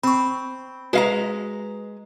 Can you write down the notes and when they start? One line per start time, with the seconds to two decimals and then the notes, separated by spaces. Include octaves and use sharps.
0.03 C4 B5 C#6
0.93 G#3 F#4 B4 F5 A#5